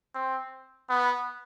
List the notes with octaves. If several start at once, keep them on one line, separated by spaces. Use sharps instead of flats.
C4
B3